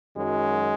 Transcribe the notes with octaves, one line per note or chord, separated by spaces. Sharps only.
F#2 D#3 F#3 G#3